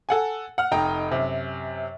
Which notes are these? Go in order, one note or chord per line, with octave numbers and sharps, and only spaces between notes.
A4 F#5 G#5
F#5 F6
F1 D#4 D#5 G5 A#5
F#2 C3